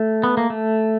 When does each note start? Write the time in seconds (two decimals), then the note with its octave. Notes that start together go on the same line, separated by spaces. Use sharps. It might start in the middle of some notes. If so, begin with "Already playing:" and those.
Already playing: A3
0.24 B3
0.37 A#3
0.50 A3